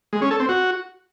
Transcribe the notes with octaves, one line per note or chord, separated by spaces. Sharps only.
G#3
C#4
A4
C4
F#4